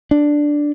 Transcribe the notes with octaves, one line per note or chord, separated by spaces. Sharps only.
D4